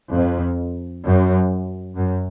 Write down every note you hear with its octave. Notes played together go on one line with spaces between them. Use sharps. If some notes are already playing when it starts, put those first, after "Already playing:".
F2
F#2
F#2